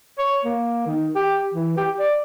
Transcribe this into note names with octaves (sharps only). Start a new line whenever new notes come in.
C#5
A#3
D#3
G4
E3
G4
D5